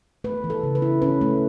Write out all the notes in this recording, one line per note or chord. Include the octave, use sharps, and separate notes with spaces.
A3 B4
E3
A4
C#3
B4
E4
C#4 B4
A3